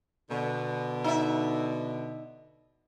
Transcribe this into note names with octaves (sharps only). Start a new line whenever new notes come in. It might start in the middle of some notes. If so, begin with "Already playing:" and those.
B2 D3
D#4 E5